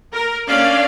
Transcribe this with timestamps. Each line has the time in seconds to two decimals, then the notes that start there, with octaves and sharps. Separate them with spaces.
0.13 A#4
0.47 A#3 C#4 D4 D5 F5